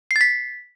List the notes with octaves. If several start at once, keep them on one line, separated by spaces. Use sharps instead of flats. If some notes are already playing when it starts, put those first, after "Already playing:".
C7
A6
B6